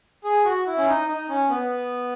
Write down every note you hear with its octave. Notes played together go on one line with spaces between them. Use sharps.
G#4
F#4
E4
C#4
D#4
D#4
C#4
B3